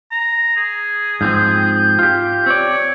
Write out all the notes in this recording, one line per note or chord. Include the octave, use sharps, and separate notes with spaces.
A#5
G#4
G#2 F3 C4 G6
F4 G4
C4 C#5 D5